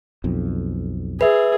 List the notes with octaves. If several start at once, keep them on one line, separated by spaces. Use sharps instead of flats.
B1 F2
G#4 B4 E5